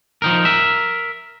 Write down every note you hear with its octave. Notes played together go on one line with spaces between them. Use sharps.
F3 D#4 A#4
A#4 E5